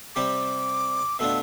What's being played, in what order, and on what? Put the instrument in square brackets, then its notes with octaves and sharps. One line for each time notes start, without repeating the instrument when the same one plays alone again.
[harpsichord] C3 G3 C4 G4 [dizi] D6
[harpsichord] B2 A3 D4 F4 [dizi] E6